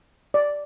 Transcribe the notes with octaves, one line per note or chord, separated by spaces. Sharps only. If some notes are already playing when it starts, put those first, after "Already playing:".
D5